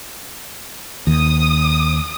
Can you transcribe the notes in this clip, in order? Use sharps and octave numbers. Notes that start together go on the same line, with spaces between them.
D#2 D#6